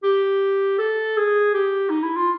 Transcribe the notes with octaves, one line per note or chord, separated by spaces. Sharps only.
G4
A4
G#4
G4
D#4
E4
F4